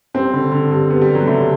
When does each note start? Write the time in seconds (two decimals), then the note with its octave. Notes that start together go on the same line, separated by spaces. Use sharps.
0.14 G2 C4
0.33 D3
0.52 D3
0.71 G2
0.90 G2 B3
1.02 G3
1.09 G2
1.15 F#3
1.21 B3
1.27 D3 A3